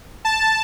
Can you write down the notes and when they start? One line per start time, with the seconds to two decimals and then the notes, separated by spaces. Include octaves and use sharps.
0.25 A5